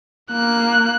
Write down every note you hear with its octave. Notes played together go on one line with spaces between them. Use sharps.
A#3 F#6